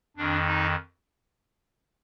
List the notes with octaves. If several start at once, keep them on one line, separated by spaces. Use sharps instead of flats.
F2 D#3 D4
D#4